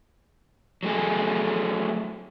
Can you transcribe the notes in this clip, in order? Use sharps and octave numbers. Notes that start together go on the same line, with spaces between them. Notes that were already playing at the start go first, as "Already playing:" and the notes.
F#3 A3 G#4